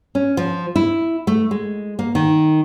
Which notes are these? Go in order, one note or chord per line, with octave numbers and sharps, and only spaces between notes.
C#4
F3
E4
A3
G#3
A#3
D#3